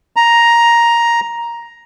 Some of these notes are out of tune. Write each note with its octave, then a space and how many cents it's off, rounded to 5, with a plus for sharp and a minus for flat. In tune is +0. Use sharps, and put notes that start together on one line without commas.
A#5 +5